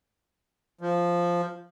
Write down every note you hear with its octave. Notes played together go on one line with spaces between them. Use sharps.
F3